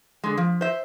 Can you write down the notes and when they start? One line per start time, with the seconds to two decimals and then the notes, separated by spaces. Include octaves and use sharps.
0.24 D3 G#3
0.37 F3
0.61 C5 E5